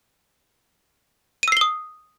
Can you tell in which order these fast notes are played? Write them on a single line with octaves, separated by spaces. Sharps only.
D#7 E6 C7 G7 D#6